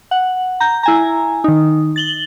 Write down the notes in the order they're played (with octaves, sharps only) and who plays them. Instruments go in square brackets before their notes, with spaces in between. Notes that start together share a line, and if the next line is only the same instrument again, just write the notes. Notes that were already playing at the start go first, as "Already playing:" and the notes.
[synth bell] F#5
A#5 G6
E4 G#5 A#5
D#3 D#4
A6 F#7 G7